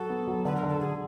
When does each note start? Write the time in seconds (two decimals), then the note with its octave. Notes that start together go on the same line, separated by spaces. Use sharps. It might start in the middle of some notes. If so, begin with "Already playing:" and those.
Already playing: F#3 F#4 A4
0.10 B3
0.27 F#3
0.45 D3 B4
0.56 A#4
0.63 D3
0.68 A4
0.81 D3 G#4